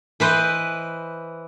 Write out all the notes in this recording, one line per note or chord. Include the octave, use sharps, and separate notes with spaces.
E3 B4 C5 D#5